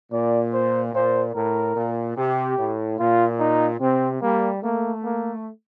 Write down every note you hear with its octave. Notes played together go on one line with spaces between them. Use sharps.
A#2 D5
C5
A#2 C5
A2 A#4
A#2
C3 G4
A2
A#2 F4
D#4
C3 C4
G3 A#3
A3 A#3
A#3